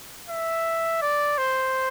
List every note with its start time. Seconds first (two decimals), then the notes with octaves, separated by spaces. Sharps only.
0.29 E5
1.02 D5
1.38 C5